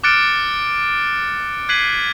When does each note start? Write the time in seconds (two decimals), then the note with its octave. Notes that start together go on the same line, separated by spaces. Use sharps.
0.03 D6 F6 F#6 A6 C#7 D7
1.69 F#6 G#6 B6 C7 D#7 F#7